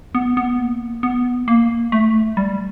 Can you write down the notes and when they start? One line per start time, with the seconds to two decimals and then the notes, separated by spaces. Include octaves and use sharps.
0.15 B3
0.37 B3
0.59 A#3
1.03 B3
1.48 A#3
1.92 A3
2.37 G3